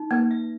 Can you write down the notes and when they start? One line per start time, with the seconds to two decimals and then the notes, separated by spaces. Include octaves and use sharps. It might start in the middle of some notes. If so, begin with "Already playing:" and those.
Already playing: D#4
0.11 A#3 B4
0.31 E5